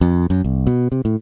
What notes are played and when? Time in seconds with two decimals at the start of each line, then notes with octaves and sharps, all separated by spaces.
0.01 F2
0.30 F#2
0.44 C2
0.67 B2
0.92 C3
1.05 A2